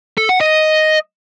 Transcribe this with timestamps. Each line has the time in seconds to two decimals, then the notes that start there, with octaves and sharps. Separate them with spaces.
0.18 A4
0.29 F#5
0.41 D#5